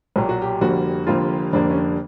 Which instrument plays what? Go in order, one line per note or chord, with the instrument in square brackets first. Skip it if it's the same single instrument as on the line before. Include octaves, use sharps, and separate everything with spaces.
[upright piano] B1 A#2 F#3 G4
F#4
G4
F1 F2 D3 G3 A#3 F#4
F1 F2 D3 G3 A#3 F4
F1 F2 D3 G3 A#3 D4
C#4
D4